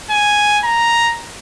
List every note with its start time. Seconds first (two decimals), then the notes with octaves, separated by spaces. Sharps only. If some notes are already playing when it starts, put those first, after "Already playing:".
0.11 G#5
0.64 A#5